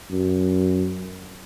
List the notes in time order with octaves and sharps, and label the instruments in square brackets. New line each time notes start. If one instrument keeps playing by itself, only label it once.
[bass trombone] F#2